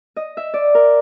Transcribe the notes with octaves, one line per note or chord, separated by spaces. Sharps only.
D#5
E5
D5
A#4